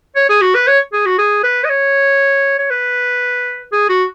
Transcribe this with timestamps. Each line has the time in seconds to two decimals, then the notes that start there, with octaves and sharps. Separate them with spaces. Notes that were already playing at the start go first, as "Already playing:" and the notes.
0.16 C#5
0.29 G#4
0.41 F#4
0.55 B4
0.67 C#5
0.93 G#4
1.06 F#4
1.18 G#4
1.44 B4
1.64 D#5
1.69 C#5
2.59 C#5
2.70 B4
3.72 G#4
3.89 F#4